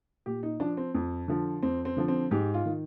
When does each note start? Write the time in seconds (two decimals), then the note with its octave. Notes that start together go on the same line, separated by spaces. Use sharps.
0.26 A#2 G4
0.43 D#4
0.60 F3 D4
0.77 C4
0.94 F2
1.28 D3 F3
1.63 F2 C4
1.85 C4
1.97 D3 F3
2.08 C4
2.31 G#2 G4
2.54 F4
2.66 D#3